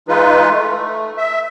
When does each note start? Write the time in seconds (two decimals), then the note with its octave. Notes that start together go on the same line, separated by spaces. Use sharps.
0.08 E3 G#3 D#4 F4 B4
0.50 A3
1.18 E5